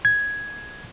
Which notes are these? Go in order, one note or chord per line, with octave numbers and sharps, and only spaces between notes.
G#6